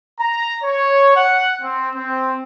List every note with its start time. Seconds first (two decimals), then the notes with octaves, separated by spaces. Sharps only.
0.20 A#5
0.64 C#5
1.16 F#5
1.62 C4
1.95 C4